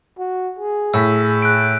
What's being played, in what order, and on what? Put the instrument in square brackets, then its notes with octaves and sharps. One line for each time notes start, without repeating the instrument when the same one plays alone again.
[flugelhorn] F#4
G#4
[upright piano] A2 [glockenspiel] E6 B6
[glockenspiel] F#6 D7